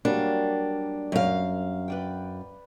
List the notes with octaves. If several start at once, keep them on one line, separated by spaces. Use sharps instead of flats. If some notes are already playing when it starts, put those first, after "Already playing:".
F#3 G3 A#3 D4
F#2 F5
B4 D5 G5